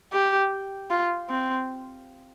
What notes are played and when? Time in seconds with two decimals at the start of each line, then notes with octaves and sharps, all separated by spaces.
0.13 G4
0.90 F4
1.29 C4